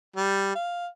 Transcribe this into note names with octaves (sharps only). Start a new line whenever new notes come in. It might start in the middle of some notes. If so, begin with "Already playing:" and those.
G3
F5